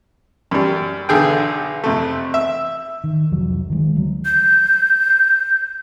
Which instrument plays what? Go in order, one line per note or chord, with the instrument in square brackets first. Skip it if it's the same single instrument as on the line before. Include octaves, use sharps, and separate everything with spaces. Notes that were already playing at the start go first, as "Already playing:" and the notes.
[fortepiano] F#2 G3
B1 D3 G#4 G5
F2 C3 A3
E5
[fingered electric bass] D#3
C2 F2 F3 F#3
D#3 E3 G#3
D2 F#3
[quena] G6